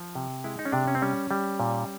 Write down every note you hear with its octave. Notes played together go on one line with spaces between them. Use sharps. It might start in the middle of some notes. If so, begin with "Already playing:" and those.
Already playing: F3
C3
G#3 E4
D#4
C#4
C3 D4
C#4
C4
G3 C#4
G3
A#2